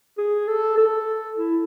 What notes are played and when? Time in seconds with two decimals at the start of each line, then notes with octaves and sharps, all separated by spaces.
0.18 G#4
0.48 A4
0.77 A4
1.38 E4